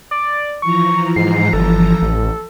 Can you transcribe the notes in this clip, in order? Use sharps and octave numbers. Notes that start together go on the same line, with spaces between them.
D5
E3 F3 A#5 C#6
G#2 C7
G1 A4
A1